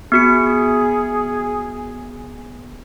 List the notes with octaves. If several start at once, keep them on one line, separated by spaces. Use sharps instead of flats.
B3 F#4 G#4 C#7